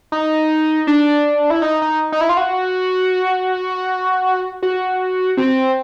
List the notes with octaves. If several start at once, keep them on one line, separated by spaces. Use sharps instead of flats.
D#4
D4
E4
D#4
D#4
D#4
E4
F4
F#4
F#4
C4